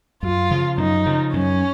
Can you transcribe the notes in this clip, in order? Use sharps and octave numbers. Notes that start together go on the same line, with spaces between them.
F#2 F4
C#3 F3
F#2 D#4
C#3 F3
F#2 C#4